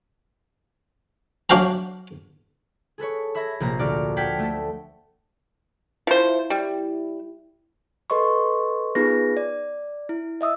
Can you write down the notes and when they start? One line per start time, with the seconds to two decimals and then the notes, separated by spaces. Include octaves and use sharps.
1.50 F#3 D4 F#4 F5 G5 A#5
2.98 G#4 A4 B4 C#5
3.35 E5 B5 E6 G#6 A#6
3.60 A#1 C3 A#3 A#5 A#6
3.79 D2 F#4 D5 F6
4.16 F#5 G5 A5 F6 G#6 B6
4.39 A3 A4
6.07 F3 E4 C5
6.50 G3
8.10 A4 B4 D#5 C6 C#6
8.95 B3 D#4 F4 G#4 B4 A#6
9.37 D5
10.09 E4
10.41 D#5 E5 D#6 E6